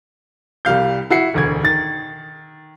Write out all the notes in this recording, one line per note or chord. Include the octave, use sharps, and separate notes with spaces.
C2 G3 F5 G6
E4 F#4 C7 C#7
E1 D2 G#6
D#3 A6